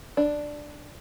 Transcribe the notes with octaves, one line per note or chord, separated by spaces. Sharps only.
D4